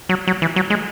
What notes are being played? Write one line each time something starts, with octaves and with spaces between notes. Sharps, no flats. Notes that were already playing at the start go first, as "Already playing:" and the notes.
F#3
F#3
E3
F#3
G#3